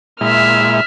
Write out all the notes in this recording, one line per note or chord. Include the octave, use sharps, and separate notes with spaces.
A#2 G#3 E4 E5 F6